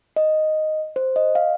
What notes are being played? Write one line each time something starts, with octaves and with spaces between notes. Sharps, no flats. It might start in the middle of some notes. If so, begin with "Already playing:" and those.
D#5
C5
D#5
F5